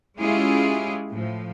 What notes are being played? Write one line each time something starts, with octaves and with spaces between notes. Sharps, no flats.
G#3 C#4 E4 F4 G4 G#4
A2 F3